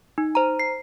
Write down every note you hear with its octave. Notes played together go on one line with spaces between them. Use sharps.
D#4
C5 A#5
C7